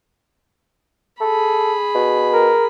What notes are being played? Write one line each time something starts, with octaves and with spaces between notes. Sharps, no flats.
G#4 A4 B5
B2
A#4